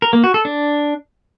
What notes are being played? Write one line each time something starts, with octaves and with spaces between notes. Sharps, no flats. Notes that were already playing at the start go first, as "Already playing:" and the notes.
A#4
A#3
F#4
A4
D4